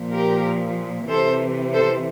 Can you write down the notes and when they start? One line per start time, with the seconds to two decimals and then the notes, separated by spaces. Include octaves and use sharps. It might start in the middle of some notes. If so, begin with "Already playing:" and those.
Already playing: A#2 F3
0.12 G4 A#4
1.08 C3 E3 A4 C5
1.72 A4 C5